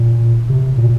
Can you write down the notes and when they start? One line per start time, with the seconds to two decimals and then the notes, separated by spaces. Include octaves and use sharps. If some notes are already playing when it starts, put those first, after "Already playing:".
Already playing: A#2
0.50 C3
0.78 A#2